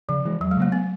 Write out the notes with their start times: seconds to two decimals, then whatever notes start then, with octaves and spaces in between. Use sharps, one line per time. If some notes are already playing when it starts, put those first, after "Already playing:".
0.09 C#3 F3
0.25 E3 G#3
0.41 E2 F#3
0.51 G#3
0.57 C#3 F3 A3 A#3
0.72 B3